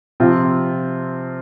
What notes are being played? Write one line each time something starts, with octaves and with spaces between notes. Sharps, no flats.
C3 F3 C4 F4